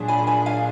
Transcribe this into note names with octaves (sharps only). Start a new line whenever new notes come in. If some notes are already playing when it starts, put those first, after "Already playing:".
Already playing: A#2 F#3 D4 G#4
G#5 B5
G#5 B5
F5 G#5